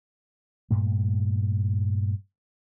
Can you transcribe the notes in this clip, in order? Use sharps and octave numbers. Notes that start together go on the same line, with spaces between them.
G2 A#2 A3